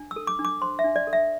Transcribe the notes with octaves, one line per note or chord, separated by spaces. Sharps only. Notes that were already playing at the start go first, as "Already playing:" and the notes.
Already playing: D4
E6
A4
D6
D4
D6
C5 C6
E5
D4
D5
A4
E5